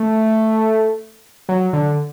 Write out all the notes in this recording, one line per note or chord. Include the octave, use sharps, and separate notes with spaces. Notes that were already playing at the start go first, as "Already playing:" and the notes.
Already playing: A3
F#3
D3